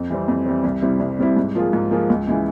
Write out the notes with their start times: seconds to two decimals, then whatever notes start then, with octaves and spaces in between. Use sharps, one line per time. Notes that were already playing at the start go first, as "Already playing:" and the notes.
Already playing: F2
0.10 E3 G3 C4
0.28 F2
0.46 E3 G3 C4
0.64 C2
0.82 C3 G3 C4 E4
1.00 C2
1.19 C3 G3 C4 E4
1.36 G#2
1.55 F3 A#3 F4 G#4
1.73 G#2
1.91 F3 A#3 F4 G#4
2.10 C#2
2.27 C#3 E3 G#3 E4